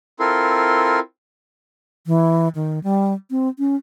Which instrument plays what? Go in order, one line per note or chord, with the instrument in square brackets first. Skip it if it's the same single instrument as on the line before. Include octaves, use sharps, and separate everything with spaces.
[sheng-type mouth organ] C4 E4 F4 A4 A#4 C6
[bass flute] E3
D#3
G3
C4
C#4